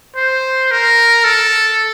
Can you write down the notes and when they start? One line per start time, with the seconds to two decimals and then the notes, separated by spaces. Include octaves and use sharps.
0.16 C5
0.71 A#4
1.24 A4